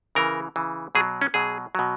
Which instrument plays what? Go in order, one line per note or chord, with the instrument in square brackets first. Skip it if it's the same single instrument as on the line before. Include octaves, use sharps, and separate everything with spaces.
[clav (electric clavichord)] C#3 E3 A#4
C#3 E3
B2 F#3 G#4
C#4
B2 F#3 G#4
B2 F#3